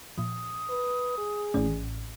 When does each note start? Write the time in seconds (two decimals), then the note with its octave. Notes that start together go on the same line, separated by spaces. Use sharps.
0.18 A#2 F3 D#6
0.69 B4
1.18 G#4
1.54 A1 A2 C#4 D5